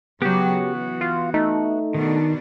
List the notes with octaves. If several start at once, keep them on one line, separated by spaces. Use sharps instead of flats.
C#3 F#3 B3 F#4 G4
E3
F4
A3 D#4
B2 D#3 D4